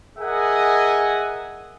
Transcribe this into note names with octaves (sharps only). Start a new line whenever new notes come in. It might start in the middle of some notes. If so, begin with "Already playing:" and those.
G#4 A#4 D#5 E5 F#5 G#5